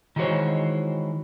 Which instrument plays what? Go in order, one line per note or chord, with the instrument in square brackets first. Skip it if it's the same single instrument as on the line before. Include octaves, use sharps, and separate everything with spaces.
[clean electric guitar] D#3 E3 G#3 F#4 C5 C#5